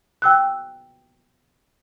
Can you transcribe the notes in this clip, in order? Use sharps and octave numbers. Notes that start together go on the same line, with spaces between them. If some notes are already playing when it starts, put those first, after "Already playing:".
G5 E6 F#6